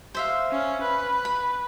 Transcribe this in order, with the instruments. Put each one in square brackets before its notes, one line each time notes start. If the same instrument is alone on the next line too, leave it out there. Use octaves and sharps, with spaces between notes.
[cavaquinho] C5 E5 F5
[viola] C#4
B4
[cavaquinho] B5